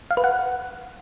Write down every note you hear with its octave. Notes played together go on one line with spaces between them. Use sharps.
F5
B4
F#5